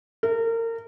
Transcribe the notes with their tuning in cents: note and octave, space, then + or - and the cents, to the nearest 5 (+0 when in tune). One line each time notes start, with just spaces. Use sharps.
A#4 -30